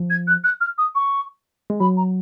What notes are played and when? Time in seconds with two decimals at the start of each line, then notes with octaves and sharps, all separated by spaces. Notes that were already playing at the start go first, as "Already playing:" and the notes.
Already playing: F3
0.10 G#6
0.27 F#6
0.44 F#6
0.61 F6
0.78 D#6
0.95 C#6
1.70 G#3
1.80 F#3 B5
1.97 A#5